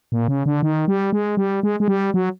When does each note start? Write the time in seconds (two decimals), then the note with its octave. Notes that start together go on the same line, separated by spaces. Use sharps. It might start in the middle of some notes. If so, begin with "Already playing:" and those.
0.12 A#2
0.28 C#3
0.46 D3
0.63 D#3
0.88 G3
1.13 G#3
1.37 G3
1.63 G#3
1.80 G#3
1.88 G3
2.14 F#3